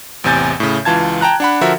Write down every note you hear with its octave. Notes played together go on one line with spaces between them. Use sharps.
A1 E2 C3 G#5 G6 A6
A2 C#3
C#2 E3 F4 A5 G#6
G5 A5 A#5 F#6
D4 F#5 B5
D3 F3 F#4 A#4 E5